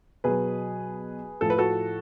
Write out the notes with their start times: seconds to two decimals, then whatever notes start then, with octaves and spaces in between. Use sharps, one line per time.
0.24 B2 F#3 G#4 B4
1.41 A2 F3 A4
1.50 B4
1.58 F#4 A4